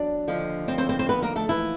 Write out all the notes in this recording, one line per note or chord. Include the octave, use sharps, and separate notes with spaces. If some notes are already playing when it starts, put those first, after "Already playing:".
Already playing: E2 F#3 D4 D5
D#2 D3 F3
C4 C5
C4 C5
C4 C5
C4 C5
B3 B4
A#3 A#4
A3 A4
E3 E4